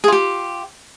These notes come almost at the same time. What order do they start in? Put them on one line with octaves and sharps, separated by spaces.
G#4 F4 G4